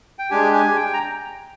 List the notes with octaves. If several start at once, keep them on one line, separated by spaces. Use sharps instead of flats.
G5
G#3 D4 G4 G#5
G#5
G5
A#5